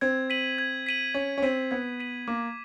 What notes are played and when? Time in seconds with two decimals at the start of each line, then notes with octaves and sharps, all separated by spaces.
0.01 C4 G#6
0.30 B6 D#7 F#7
0.58 G#6
0.86 B6 D#7 F#7
1.14 C#4 G#6
1.38 C#4
1.42 C4 B6 D#7 F#7
1.71 B3 G#6
2.00 B6 D#7 F#7
2.28 A#3 D6